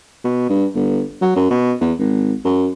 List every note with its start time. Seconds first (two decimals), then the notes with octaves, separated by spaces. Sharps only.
0.25 B2
0.50 G2
0.75 G1
1.21 F#3
1.36 F#2
1.50 B2
1.81 E2
1.99 G#1
2.44 F#2